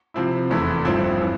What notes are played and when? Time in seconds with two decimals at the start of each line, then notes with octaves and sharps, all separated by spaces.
0.14 C3 F3 C4 E4
0.50 F1 E2 E3 A3 E4
0.85 A1 G2 F3 C4 E4
1.21 E3